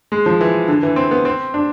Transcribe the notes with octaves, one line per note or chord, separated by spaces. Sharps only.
G#3
F3
E3
D3
E3
C4
B3
C4
D4